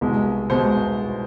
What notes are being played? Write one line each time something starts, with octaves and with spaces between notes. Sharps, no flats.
C2 B2 G#3
B2 G#3 C5